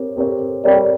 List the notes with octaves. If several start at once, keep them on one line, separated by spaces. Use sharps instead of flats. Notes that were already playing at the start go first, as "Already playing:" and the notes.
Already playing: C4 G4 A#4 C#5
C4 G4 A#4 C#5
G3 C4 G4 A#4 C#5